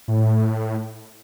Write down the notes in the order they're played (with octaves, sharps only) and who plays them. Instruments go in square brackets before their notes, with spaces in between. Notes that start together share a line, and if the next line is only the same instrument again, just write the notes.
[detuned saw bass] A2